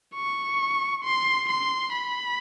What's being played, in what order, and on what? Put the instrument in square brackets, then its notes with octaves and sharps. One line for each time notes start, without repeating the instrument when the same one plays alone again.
[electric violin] C#6
C6
C6
B5